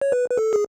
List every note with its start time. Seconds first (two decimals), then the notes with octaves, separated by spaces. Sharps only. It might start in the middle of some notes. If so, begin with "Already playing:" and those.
0.01 C#5
0.12 B4
0.30 B4
0.37 A4
0.53 G#4